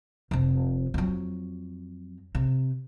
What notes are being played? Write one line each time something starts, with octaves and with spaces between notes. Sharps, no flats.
F1 C3
F2 F#3
C3